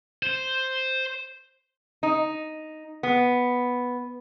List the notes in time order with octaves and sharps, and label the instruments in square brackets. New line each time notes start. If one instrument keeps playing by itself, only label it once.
[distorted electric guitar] C5
[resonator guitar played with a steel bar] D#4
B3